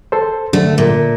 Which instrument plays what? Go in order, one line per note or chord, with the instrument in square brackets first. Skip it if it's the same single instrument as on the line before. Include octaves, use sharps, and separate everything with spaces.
[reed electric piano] A4 C5
[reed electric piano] D3 [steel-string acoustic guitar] A3
[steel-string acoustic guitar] A#2